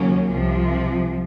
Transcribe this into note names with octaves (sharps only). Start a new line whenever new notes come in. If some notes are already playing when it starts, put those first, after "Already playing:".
Already playing: D#2 C#3 F#3 A#3 C#4
C2 C3 F3